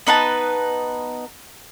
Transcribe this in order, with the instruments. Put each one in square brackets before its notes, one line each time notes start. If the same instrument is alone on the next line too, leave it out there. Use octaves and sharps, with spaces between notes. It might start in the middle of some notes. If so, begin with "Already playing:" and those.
[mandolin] B3 D#4 B4 A5